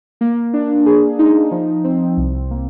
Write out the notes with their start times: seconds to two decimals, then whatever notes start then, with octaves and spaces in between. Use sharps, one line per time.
0.21 A#3
0.53 D4
0.86 G#4
1.19 D#4
1.51 F3
1.84 C4
2.17 C2
2.51 A#3